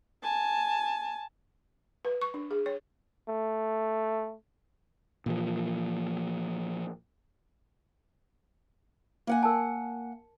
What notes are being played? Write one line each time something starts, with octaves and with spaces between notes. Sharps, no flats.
G#5 A5
B4
C#6
D4
G#4
C#5
A3
A#2 E3 F3
A#3 F#5 G#5
A#4 A5